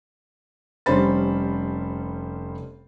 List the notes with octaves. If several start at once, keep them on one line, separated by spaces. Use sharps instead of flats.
F1 G3 C#4 C5 B5 A6